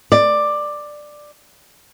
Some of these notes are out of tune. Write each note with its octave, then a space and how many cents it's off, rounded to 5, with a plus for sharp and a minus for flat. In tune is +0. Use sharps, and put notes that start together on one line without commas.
D5 +10